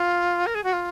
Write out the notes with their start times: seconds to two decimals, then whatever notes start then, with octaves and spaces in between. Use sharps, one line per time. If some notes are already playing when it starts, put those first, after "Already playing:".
Already playing: F4
0.46 A#4
0.54 G#4
0.63 F#4
0.72 F4